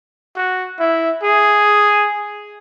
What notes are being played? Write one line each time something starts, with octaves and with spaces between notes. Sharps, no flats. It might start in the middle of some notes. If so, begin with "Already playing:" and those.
F#4
E4
G#4